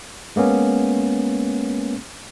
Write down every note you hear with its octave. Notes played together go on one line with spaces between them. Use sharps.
G#3 A#3 B3 C#4